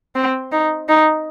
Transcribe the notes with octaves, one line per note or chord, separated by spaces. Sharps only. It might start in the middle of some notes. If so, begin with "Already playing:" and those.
C4
D#4
D#4